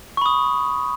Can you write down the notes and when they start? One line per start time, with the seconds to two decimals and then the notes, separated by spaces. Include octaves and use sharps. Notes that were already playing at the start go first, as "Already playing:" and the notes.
0.17 C#6
0.22 B5
0.26 D#6